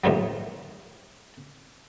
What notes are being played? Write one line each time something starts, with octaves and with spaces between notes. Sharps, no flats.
D#2 A2 F3 F#3